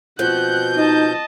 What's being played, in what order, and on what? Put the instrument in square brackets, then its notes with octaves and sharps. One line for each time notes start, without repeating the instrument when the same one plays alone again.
[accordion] B2 G6 [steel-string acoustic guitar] F3 C4 [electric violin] F#5 F#6
[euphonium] D#4 [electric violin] D#5 A5